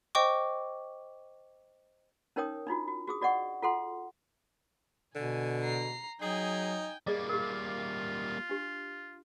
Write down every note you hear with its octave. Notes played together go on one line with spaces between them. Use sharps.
C5 D#5 G5 C#6 D6
C#4 D#4 A#4 C#5 G5 D#6
D4 D#4 F4 F#4
F#4
F#4 G#4 D#6
F#4 D5 D#5 F#5 C#6
F4 A4 F#5 C6
B2 D3 G#5
A#5 C7
F#3 D#4 G#4 G5 G#5
G3 A#3 G#4 D5 D#5
F4 G4 A#4
D4 G4